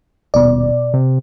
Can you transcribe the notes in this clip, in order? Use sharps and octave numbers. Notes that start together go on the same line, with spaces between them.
D#1 B2 D5
C3